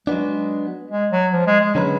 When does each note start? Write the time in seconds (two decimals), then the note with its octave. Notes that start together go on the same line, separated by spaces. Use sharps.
0.07 F#3 G#3 B3 D4
0.91 G#3
1.12 F#3
1.33 F3
1.46 G#3
1.61 G#3
1.75 D3 F#3 G#3 C#4 G#4 B4